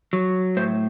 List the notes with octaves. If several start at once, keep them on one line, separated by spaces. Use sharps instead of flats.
F#3
A2 C5